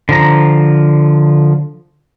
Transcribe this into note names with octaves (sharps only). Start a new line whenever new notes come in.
D3 F3 A#5